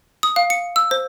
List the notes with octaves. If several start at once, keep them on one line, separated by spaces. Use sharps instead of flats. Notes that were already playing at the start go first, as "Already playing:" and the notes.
D#6
F5
C#7
E6
C5